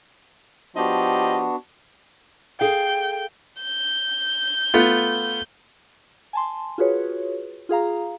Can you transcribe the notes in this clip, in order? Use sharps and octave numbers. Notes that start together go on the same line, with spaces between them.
F3 B3 D4 F#4 G4 D#5
G#4 A4 F5 G5
G6
A3 B3 F4
G#5 A5 C6
F4 F#4 G#4 B4 C#5
F4 G#4 F5 A#5